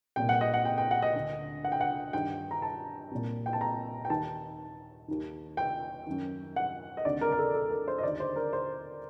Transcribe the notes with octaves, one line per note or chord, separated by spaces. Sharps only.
C2 A#2 G5
F#5
D#5
F#5
G5
G5
F#5
D#5
D2 D3
F#5
G5
F#5
G2 D#3 G5
A#5
A5
C2 A#2
G5
A5
A#5
G5
D#2 D#3 A5
D#2 D#3
G5
F#2 D#3
F#5
D#5
D2 C3 D#3 D5
A#4
A#4
A4
A4
A#4
C5
D#5
D#2 D3 D5
C5
A#4
C5